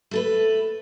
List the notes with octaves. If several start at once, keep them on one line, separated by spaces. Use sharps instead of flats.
A3 A4 B4